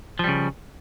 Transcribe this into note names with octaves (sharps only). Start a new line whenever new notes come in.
C#3 F3 G3